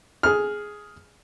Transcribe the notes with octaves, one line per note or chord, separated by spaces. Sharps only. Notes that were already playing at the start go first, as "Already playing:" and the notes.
G#4 F6